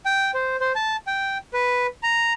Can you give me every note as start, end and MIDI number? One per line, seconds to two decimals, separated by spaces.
0.06 0.31 79
0.34 0.56 72
0.60 0.72 72
0.75 0.96 81
1.07 1.38 79
1.54 1.87 71
2.03 2.33 82